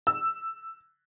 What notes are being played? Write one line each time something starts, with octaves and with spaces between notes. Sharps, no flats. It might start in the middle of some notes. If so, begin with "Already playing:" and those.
E6